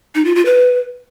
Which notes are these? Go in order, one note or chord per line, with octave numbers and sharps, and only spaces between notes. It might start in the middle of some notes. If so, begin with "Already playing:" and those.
D#4
F4
F4
B4